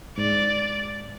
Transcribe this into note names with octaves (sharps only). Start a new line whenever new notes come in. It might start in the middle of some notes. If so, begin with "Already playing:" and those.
G#2 D5